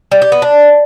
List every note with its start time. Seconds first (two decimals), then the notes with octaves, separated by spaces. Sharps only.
0.11 G3
0.22 G4
0.32 B3
0.42 D4